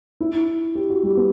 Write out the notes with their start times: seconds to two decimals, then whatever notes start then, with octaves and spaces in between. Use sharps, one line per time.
0.20 E4
0.75 G4
0.90 F#4
1.03 G3
1.17 B3